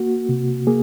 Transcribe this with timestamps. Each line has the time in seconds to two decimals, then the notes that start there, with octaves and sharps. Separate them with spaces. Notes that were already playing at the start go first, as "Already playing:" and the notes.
Already playing: A#3 F#4
0.29 C3
0.67 A#3 G#4